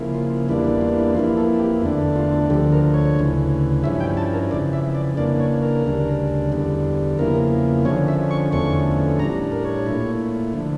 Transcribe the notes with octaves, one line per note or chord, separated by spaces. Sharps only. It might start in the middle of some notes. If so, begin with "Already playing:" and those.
Already playing: C#3 F3 A#3 E4
F4
E2 E3 G3 A#3 D4 E4
E4
F4
E4
F2 E3 A#3 E4 F4
A4
G4
E2 D3 A3 D4 E4
F4
D2 D3 F3 G4
A#4
C#5
D2 C#3 E3
G2 F3 C#4 E4 E5
G5
A5
A#4
F2 C#3 E3 D5
E5
D5
C#3 E3 A#3 D4 D5
C#5
A#4
D2 C#3 G3 D4
E2 D3 G3
E2 C#3 F3 A#3 E4 A#4
F2 D3 F3 C#4 C#5
E5
C#6
E2 D3 F3 A3 C#4 C#6
A2 G3 D4 A#5
A#4
C#5
A#2 A3 E4
D3 F3